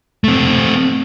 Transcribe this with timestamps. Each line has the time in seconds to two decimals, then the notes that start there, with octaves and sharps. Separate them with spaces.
0.24 A3 C4